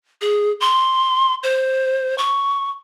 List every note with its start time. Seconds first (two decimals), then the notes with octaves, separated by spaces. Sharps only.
0.21 G#4
0.61 C6
1.43 C5
2.18 C#6